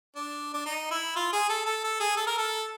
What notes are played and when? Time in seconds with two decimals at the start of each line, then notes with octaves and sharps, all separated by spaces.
0.15 D4
0.54 D4
0.66 D#4
0.91 E4
1.16 F4
1.33 G#4
1.49 A4
1.66 A4
1.84 A4
2.00 G#4
2.17 A4
2.27 A#4
2.38 A4